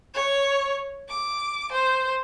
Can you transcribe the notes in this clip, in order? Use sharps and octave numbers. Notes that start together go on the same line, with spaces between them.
C#5
D6
C5